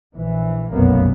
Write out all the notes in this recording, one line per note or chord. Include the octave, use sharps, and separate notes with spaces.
A#1 E3
F1 B1 F#2 A#3 B3